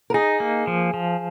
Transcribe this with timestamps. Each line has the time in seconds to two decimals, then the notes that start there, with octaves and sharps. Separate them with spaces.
0.10 A#4
0.14 D#4 G#4
0.40 A#3
0.67 F3
0.94 F3